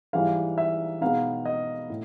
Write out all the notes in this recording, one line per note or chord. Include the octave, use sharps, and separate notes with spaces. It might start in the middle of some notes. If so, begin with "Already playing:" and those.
G#2 E3 G3 F5
E5
B2 G#3 B3 D#4 F5
D#5
A2